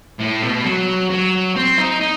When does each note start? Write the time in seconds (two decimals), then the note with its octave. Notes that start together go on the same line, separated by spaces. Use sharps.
0.20 A2
0.43 B2
0.65 F#3
1.11 F#3
1.56 C4
1.78 D#4
2.01 D#4